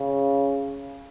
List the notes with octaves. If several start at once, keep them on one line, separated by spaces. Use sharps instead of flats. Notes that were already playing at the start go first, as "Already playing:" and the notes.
Already playing: C#3